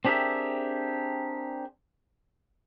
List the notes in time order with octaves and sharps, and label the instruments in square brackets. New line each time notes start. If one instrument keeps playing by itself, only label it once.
[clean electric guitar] C4 D4 G4 G#4 A#4 E5